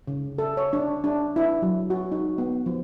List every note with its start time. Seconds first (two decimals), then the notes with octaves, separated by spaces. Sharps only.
0.07 C#3
0.38 A4
0.57 C#5
0.73 D4
1.04 D4
1.36 E4
1.62 F#3
1.90 F#4
2.12 D#4
2.38 B3
2.66 F3